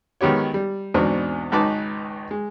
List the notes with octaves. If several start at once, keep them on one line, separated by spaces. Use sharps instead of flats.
G#1 D#3 B3 G4 C#5
G3
E2 G#2 B2 C4 D4 D#4
G#1 C#2 D#4 B4 A5 D6
G#3